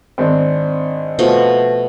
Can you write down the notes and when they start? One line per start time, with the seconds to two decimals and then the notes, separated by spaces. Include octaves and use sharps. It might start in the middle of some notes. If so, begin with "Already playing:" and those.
0.18 G#1 C4 D4
1.19 B2 F3 A3